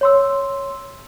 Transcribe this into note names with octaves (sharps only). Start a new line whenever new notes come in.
C#5 C6 E6